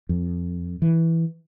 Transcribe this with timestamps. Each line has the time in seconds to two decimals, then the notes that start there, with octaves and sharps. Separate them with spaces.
0.09 F2
0.82 E3